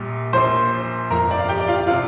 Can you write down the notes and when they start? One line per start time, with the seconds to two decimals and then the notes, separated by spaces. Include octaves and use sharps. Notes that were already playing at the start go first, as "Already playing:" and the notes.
Already playing: A#1 A#2 G3
0.33 A#1 A#2 F3 C5 C6
1.10 G1 F2 F3 A#4 A#5
1.31 D5
1.39 F5
1.48 G4 G5
1.60 D5
1.68 F4 F5
1.87 C3 F4 F5